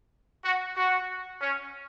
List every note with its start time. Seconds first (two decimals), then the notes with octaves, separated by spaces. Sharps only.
0.45 F#4
0.77 F#4
1.41 C#4